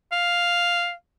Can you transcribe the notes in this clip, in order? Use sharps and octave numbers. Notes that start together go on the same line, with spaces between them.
F5